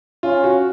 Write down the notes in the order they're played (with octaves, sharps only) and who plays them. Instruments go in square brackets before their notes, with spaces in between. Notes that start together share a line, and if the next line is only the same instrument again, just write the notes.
[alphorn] C#4 [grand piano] F4
[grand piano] F#4